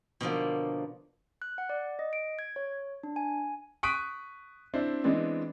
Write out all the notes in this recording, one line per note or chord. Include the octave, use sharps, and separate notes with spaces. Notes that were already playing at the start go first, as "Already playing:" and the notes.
B2 D3 F3 A#3
F#6
F#5
D5
D#5
D7
G#6
C#5
D4
G#5
C#6 D#6 F#6 B6 D7 D#7
C4 D4 E4 C5
E3 G#3 B3 C4 D4